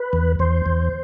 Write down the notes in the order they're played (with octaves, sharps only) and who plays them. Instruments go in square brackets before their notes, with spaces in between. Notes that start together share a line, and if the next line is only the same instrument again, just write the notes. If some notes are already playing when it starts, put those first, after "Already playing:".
Already playing: [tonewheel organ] B4
E2
E2 C5
E2